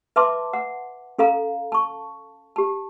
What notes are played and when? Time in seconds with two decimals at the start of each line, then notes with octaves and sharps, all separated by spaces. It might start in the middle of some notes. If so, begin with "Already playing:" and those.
0.16 B4 E5 A5 C6 D6
0.53 F#5
1.19 C#4 A4 F5 A#5
1.72 A5 C#6
2.56 G4 A5